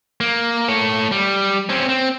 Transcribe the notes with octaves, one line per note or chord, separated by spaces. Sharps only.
A#3
A3 C#5
G3
C4 C#4
C4